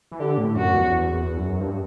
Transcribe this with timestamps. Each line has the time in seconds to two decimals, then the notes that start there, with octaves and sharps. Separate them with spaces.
0.12 E3
0.20 D3 G4
0.38 A2
0.56 F#2 F#4
0.74 E2
0.90 E2
1.13 E2
1.37 F#2
1.61 G2